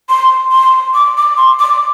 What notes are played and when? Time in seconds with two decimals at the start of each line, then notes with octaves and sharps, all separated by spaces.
0.10 C6
0.52 C6
0.95 D6
1.17 D6
1.37 C6
1.59 D6